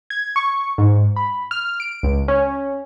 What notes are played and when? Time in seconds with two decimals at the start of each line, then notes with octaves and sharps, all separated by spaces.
0.10 G#6
0.36 C#6
0.78 G#2
1.16 B5
1.51 F6
1.80 D7
2.03 C#2
2.28 C#4